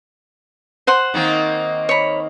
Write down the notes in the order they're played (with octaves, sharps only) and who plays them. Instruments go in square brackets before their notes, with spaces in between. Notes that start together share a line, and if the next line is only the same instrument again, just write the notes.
[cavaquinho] C5 F#5 C6
[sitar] D#3 A#3 C4
[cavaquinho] C#5 B5